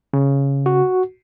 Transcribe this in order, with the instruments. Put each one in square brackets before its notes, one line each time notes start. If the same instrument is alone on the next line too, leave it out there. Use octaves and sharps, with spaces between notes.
[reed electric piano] C#3
[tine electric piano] F#4